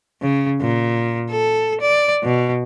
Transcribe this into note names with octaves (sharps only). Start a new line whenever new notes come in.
C#3
A#2
A4
D5
B2